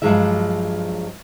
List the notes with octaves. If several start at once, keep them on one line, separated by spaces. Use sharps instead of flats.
G2 C3 F3 F#3 G#3 E5